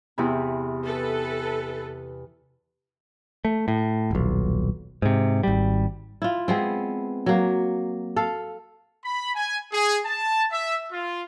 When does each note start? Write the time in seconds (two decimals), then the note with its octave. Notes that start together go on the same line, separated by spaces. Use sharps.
0.18 E2 C3 E4
0.84 A4 B4
3.45 A3
3.68 A2
4.11 D#1 B1
5.02 G#2 C3
5.43 G#1 G3
6.22 E4 F4
6.48 G#3 B3 C4
7.26 F#3 A#3
8.16 A4 F5
9.04 B5
9.35 G#5
9.73 G#4
10.04 A5
10.51 E5
10.92 F4